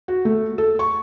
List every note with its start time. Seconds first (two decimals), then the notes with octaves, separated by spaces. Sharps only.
0.08 F#4
0.25 A3
0.58 A4
0.79 C#6